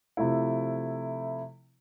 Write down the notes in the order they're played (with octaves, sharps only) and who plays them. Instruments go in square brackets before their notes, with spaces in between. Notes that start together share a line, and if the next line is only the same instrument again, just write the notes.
[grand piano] C3 F3 A3 E4